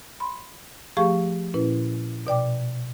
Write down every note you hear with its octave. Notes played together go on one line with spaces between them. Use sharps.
B5 C6
F3 A3 G4 G#4 F5 C#6
A#2 C#4 E4 B4
B2 D5 G5 D6